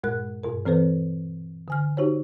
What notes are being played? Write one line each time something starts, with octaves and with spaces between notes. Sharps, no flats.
G2 A#2 G#3 A#4 F#6
G2 B2 A#4
E3 C4 A4 B4 C5
D3 G#5 F6
D#4 F#4 G4 C5 C#5